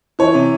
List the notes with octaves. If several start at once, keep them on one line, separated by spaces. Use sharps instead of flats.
E3 C#5
C3